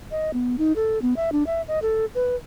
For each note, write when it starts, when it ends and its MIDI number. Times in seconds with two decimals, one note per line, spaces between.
0.11 0.31 75
0.33 0.56 59
0.58 0.73 63
0.76 1.01 69
1.02 1.14 59
1.17 1.30 76
1.32 1.46 62
1.47 1.62 76
1.68 1.79 75
1.82 2.05 69
2.15 2.35 71